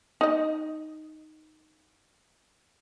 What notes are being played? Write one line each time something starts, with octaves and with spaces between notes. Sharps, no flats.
D#4 D#5